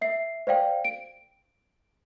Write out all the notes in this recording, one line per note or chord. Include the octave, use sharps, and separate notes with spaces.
E5 C7
C5 D5 F5 G5
D7